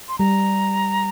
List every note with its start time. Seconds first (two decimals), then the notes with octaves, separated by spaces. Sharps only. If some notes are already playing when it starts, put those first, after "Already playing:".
0.09 C6
0.19 G3 A#5